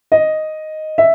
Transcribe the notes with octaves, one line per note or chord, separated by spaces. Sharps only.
D#5
E5